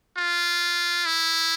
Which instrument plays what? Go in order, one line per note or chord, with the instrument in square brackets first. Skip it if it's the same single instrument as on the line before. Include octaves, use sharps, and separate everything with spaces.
[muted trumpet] F4
E4